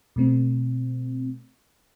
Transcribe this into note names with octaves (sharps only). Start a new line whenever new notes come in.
B2 A3 C4